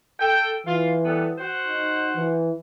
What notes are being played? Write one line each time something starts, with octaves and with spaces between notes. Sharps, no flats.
A4 G5
E3 F4
G3 B3 A4
F#4 C5 F#5
D#4
E3